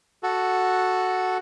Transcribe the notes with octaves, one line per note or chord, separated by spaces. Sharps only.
F#4 A4